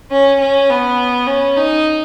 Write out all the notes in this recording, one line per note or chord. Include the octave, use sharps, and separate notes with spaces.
C#4
C#4
B3
C#4
D#4